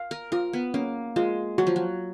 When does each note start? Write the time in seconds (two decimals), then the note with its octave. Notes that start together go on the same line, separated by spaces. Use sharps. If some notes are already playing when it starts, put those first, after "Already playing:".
Already playing: F5
0.11 A#4
0.32 F4 A#4
0.53 B3
0.74 A#3 C#4
1.16 G#3 F4
1.58 F#3 F#4
1.67 F3
1.76 F#3